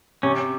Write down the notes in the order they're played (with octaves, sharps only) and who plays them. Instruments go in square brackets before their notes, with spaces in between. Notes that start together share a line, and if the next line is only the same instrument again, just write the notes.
[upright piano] C3 [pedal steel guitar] C#4